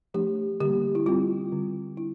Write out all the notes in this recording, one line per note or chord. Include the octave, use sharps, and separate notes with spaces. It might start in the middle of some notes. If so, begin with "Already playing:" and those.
F3 A3 D4 G4
D3 G3 A#3 G4
E4
G3 C4 F4
D3 G3 C4
D4 E4